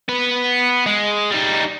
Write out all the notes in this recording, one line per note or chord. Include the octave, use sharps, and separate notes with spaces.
B3 B4
G#3
G3 D#4